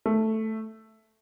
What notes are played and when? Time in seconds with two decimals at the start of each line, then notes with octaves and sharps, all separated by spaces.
0.06 A3